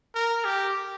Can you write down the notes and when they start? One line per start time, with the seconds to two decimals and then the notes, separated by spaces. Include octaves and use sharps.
0.15 A#4
0.45 G4